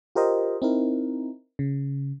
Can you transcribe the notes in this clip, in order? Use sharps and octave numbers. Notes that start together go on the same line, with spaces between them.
F4 G4 A#4 C5 D#5
C4 D#4 E4 A#4
C#3